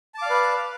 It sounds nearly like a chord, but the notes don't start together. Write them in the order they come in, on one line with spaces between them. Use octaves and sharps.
A5 D6 F5 D5 B4